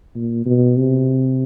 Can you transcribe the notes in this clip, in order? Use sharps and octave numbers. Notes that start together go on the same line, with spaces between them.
A#2
B2
C3